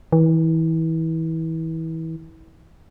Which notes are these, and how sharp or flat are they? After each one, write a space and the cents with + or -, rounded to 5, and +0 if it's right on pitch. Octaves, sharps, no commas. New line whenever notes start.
E3 -30